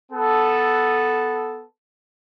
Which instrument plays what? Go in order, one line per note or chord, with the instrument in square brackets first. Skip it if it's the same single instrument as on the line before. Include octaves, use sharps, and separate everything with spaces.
[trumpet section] B3 A4